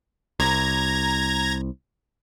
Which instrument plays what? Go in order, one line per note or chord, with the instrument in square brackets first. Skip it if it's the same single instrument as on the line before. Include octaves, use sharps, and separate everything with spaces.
[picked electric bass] C2 [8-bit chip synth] A#5 G#6 A#6